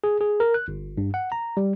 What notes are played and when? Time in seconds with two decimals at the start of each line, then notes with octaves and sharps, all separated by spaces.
0.04 G#4
0.21 G#4
0.40 A#4
0.54 F#6
0.68 G1
0.98 G2
1.14 F#5
1.32 A#5
1.57 G3